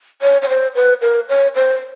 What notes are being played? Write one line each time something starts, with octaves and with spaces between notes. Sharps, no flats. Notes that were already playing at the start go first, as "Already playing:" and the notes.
C#5
C#5
C5
B4
A#4
C#5
C5